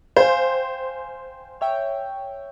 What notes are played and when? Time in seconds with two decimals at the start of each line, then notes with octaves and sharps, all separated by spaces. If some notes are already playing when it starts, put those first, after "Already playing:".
0.16 C5 F5 G5 G#5
1.61 C#5 E5 G5